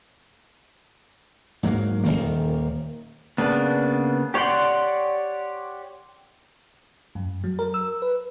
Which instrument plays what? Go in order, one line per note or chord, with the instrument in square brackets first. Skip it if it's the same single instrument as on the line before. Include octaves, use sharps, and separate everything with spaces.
[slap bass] G#2 F#3 G#3 A#3
D#1 D#2 D#3 A#3
[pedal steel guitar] C#3 A#3 B3 D4
G4 C#5 D5 F#5 C6
[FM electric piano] F#2
F#3
A#4
E6
B4